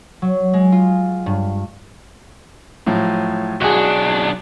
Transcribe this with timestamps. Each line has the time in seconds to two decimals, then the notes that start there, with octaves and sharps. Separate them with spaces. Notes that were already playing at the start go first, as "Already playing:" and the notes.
0.22 F#3
0.53 G#3
0.72 F4
1.26 G2
2.87 A2 F3 F#3
3.61 B1 D4 F#4 G#4